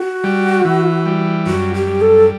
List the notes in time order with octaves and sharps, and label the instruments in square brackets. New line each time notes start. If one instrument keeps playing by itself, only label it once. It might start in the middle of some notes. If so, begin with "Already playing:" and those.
Already playing: [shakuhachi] F#4
[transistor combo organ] G3
E3
G3
[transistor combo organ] F#2 [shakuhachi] F#4
[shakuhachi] G4
[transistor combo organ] G3
[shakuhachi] A4